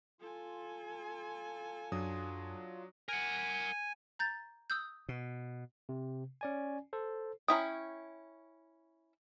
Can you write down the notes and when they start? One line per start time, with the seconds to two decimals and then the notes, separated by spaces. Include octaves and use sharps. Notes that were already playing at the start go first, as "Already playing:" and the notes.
0.21 F4 A4 G#5
1.92 F#2 F#3 D4 D#6
3.09 A#4 F#5 G#5
4.19 A#5 G6 A6
4.70 D#6 E6 G6
5.09 B2
5.89 C3
6.41 C#4 D5 G#5
6.93 A4 C5
7.48 C#4 E4 G5 A#5 D#6